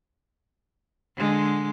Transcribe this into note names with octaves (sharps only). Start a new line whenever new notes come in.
D3 G#3